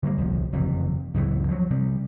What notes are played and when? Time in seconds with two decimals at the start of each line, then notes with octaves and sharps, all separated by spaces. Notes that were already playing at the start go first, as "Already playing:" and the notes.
0.03 D3 G3 A#3
0.17 D#1 C2 F3
0.53 F#1 F2 C3 E3
1.14 C#2 F#2 A2 E3
1.49 F3 F#3
1.70 C3 G3